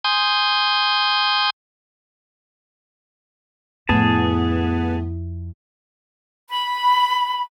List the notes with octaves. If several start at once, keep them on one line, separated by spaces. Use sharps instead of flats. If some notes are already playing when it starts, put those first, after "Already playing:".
G#5 C6 D#6 G6
F2 A2 B3 G#4 A5
B5